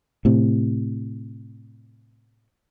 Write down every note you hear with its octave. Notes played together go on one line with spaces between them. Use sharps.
A2 C3